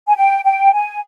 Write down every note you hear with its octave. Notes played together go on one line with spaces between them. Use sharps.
G#5
G5
G5
G#5